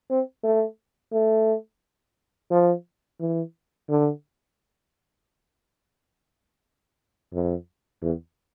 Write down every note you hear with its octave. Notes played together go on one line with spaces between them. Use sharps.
C4
A3
A3
F3
E3
D3
F2
E2